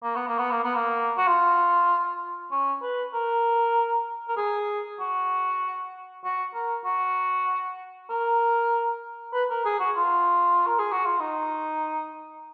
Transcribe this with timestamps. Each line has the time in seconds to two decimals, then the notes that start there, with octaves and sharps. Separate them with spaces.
0.03 A#3
0.16 B3
0.27 A#3
0.39 B3
0.51 A#3
0.64 B3
0.76 A#3
1.17 F#4
1.27 F4
2.51 C#4
2.82 B4
3.14 A#4
4.28 A#4
4.37 G#4
5.00 F#4
6.24 F#4
6.54 A#4
6.85 F#4
8.10 A#4
9.33 B4
9.50 A#4
9.65 G#4
9.80 F#4
9.96 F4
10.67 A#4
10.79 G#4
10.92 F#4
11.06 F4
11.20 D#4